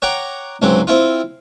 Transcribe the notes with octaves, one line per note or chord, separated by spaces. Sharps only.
C#5 F#5 G5 A#5 D6
C#2 G#2 F#3 C4
C4 E4 F4